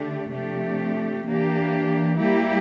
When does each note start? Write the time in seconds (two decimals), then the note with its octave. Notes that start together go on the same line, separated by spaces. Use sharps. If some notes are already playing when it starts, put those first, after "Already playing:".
Already playing: D3 A3 D4 G4
0.32 C3 F3 A3 D4 G4
1.25 E3 A#3 D4 G4
2.19 G3 A#3 E4 G4